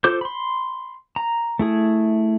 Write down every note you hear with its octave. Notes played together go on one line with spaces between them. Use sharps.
F4 A4 C5 D6 G6
B5 C6
A#5
A3 E4 G#4